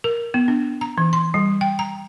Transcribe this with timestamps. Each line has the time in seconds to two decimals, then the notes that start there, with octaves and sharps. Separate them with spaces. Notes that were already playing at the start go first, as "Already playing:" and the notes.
0.04 A#4
0.34 B3
0.48 D4
0.81 A#5
0.98 E3
1.13 C6
1.34 G3
1.61 G5
1.79 A#5